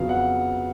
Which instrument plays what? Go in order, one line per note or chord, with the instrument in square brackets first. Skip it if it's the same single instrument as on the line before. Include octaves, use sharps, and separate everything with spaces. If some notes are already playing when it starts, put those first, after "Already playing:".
Already playing: [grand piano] F2 C#3 F#3 B3 F5
F#5